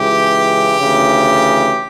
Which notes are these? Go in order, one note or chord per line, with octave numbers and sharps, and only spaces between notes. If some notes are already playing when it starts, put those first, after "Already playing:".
Already playing: C#2 C#3 E3 G4
D2 C#3 E3